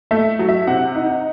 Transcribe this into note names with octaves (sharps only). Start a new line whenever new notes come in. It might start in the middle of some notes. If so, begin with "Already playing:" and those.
A3 E5
F#3
E5
C3 F#5
D#4